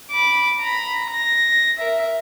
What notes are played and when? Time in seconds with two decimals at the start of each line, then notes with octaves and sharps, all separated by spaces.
0.11 B5 D6
0.60 A#5 B5
1.11 A#6
1.78 A#4 E5